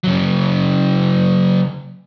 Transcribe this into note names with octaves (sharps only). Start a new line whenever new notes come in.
C#3 F#3